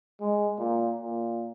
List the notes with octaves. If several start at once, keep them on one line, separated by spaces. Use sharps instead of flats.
G#3
A#2
A#2